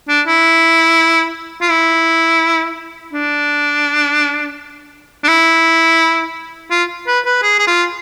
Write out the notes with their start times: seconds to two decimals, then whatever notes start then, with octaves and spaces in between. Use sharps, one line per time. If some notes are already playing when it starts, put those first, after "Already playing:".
0.09 D4
0.27 E4
1.61 F4
1.70 E4
3.13 D4
5.24 D4
5.28 E4
6.71 F4
7.07 B4
7.25 B4
7.43 G#4
7.59 G#4
7.67 F4